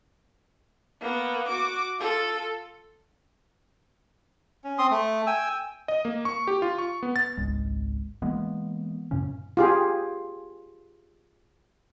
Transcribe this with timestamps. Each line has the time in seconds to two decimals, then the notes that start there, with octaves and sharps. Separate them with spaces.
1.01 A#3 B3
1.48 F#4 D6
2.00 F4 A4
4.64 C#4
4.78 C4 C6 D#6
4.91 A3
5.27 G5 G#5 E6
5.88 D#5
6.05 A#3
6.25 C#6
6.47 G4
6.62 F4
6.78 C#6
7.03 B3
7.16 A6
7.37 G#1 C#2 G#3
8.22 E3 G#3 A#3 B3
9.11 F#2 A#2 C#3 C#4
9.57 F4 G4 G#4